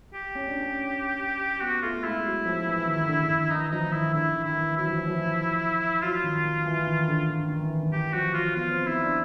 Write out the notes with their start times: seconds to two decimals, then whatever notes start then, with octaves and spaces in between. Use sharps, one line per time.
0.14 G4
0.35 C#4
0.47 D4
0.59 C#4
1.61 B3 F#4
1.82 A3 F4
2.04 G#3 E4
2.25 F#3
2.45 F3
2.66 E3
2.87 D#3
3.08 D3
3.20 D3
3.30 D#3
3.50 E3 D#4
3.71 F3 D#4
3.92 D#3 E4
4.14 D3 E4
4.35 D#3
4.45 E4
4.56 E3
4.77 F#3 E4
4.87 F3
4.97 E3
5.07 F3
6.03 F#3 F4
6.24 D#3
6.45 D#3
6.66 E3
6.87 D#3
7.08 D3
7.29 D#3
7.50 D#3
7.61 E3
7.83 D#3
7.92 E3 G4
8.13 F3 F#4
8.34 F#3 F4
8.56 B3 F4
8.71 C4
8.87 D#4 E4
9.03 D4